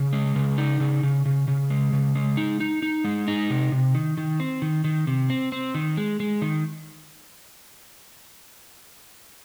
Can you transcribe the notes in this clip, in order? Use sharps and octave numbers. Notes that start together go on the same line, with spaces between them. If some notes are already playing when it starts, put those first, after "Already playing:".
Already playing: C#3
G#3
C#3
D#4
C#3
C#3
C#3
C#3
G#3
C#3
G#3
D#4
D#4
D#4
G#3
D#4
C3
C3
D#3
D#3
C4
D#3
D#3
C3
C4
C4
D#3
G#3
G#3
D#3